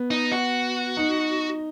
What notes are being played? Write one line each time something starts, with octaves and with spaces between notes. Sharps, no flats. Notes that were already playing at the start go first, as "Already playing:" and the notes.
Already playing: B3
D#4
F#4
D#4